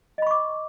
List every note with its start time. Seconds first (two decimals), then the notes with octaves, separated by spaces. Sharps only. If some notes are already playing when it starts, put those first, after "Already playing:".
0.18 D#5
0.22 B5
0.27 C#6
0.31 D6